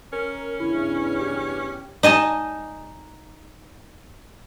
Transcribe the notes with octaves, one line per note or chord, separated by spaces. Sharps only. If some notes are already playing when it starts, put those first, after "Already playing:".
C#4 A#4
E2 G2 C#3 E4
G4
D#4 D#5 G#5 A5